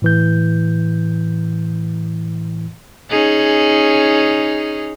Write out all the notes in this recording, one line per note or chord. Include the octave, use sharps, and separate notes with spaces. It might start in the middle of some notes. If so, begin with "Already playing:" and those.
A2 E3 G6
C#4 D#4 G#4